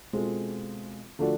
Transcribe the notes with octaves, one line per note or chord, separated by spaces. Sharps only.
B2 G#3 C4 F4 A4
D3 F3 A3 D4 F#4